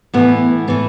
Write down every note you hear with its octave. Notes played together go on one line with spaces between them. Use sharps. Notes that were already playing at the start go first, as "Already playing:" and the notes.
A2 E3 B3
A2 E3 B3